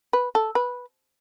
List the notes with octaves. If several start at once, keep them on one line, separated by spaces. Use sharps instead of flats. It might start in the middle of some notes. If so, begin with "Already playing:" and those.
B4
A4
B4